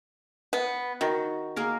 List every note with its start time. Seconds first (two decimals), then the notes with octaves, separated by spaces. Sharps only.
0.53 B3
1.01 D#3 F#4
1.56 A#3 G#4 A#4